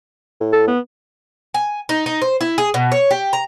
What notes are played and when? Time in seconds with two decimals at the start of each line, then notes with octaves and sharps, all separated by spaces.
0.40 A2
0.53 A4
0.68 B3
1.54 G#5
1.89 D#4
2.06 D#4
2.22 C5
2.41 E4
2.58 G#4
2.74 B2
2.92 C#5
3.11 G4
3.33 A#5